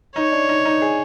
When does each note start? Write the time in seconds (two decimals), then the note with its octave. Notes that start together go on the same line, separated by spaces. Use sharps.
0.16 D#4 C#5
0.32 D4
0.49 D#4
0.65 D#4
0.82 G#4